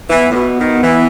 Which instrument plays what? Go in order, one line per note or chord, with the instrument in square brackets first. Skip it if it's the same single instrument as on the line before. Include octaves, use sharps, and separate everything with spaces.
[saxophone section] E3 [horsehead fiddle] B3
[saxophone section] A2
B2
D#3
E3